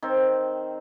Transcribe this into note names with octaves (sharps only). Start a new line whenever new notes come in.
D#3 C4